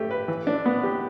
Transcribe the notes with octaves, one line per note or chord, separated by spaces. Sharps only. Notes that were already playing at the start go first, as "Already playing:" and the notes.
Already playing: A3 G4
B4
E3
D4
B3
G4